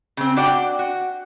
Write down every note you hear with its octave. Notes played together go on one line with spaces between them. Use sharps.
C#3 C4
D4 F#4 D5 G5
F#4